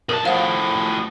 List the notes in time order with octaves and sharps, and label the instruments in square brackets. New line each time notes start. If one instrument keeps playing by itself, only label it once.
[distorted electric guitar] B1 A5 [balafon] A#4
[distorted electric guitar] A2 F3 [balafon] F5 F#5